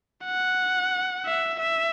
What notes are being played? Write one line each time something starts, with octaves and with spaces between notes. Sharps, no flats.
F#5
E5
E5